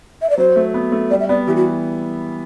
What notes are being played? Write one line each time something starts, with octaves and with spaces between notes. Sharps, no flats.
E5
D5
F#3 C5
A3
B3
A3
G3 D5
E5
B3 D5
E3 G4
F#4